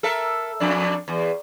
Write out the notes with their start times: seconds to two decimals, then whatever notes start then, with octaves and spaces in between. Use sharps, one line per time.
0.03 A4 A#4 E5
0.60 F2 D4
1.08 E2